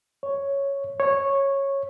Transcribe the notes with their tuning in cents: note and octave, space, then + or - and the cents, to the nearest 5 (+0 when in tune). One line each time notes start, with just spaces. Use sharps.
C#5 +0
C#5 -10